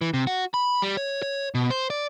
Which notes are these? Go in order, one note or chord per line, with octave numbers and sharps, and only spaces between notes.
E3
C3
F#4
B5
G3
C#5
C#5
B2
C5
D5